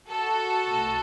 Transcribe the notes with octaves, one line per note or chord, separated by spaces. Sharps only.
F#4 A4
C2 B2 A3